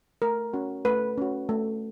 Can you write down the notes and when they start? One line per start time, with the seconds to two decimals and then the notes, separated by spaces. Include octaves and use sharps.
0.22 A3 A#4
0.53 C#4 F#4
0.85 A3 B4
1.18 C#4 F#4
1.49 A3